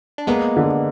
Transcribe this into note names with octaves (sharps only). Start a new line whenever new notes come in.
D4
G#3 A#3 B3
D3